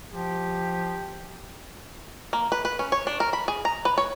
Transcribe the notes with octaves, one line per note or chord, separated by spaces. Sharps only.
F3 G4
A#3
B4
B4
C#4
C#5
D4
A#4
B5
G#4
A#5
B4
C#5